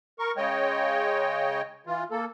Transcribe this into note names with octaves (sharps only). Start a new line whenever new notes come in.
A#4 C#6
C#3 G#3 C#5 D#5 G5
E3 F4
A#3 A4